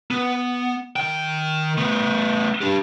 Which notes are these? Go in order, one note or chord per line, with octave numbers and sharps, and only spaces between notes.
B3
D#3 G5
A3 B3
D4 G4